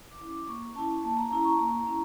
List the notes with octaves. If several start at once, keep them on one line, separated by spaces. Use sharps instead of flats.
D6
C#4 E4
D6
A#3 C#6
C#4 E4 A5
A#3 A5
A#5
C#4 E4 A#5
C#6
A#3 A#5
C#4 E4